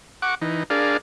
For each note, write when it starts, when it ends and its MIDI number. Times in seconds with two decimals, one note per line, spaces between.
0.22 0.35 78
0.22 0.35 85
0.22 0.35 86
0.42 0.63 52
0.42 0.63 63
0.70 0.97 62
0.70 0.97 68
0.70 0.97 70
0.70 0.97 74
0.70 0.97 77